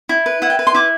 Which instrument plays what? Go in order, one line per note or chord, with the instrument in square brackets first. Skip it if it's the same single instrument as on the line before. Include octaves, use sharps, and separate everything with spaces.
[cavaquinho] E4
B4
E4 F#5
G5
B4
C6
E4 D6